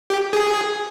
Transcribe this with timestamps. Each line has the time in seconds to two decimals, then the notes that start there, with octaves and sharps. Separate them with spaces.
0.10 G4
0.33 G#4